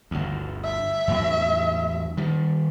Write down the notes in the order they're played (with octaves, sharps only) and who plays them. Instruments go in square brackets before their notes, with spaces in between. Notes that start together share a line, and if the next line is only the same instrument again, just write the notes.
[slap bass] G1 D2
[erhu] E5
[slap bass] E2 A2 F#3
D#3 G3